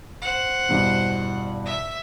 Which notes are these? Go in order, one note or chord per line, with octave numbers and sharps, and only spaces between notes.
C5 F#5
E2 G2 B2
E5